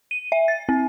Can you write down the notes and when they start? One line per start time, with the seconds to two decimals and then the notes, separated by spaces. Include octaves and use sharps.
0.11 D#7
0.32 E5
0.48 A6
0.69 C4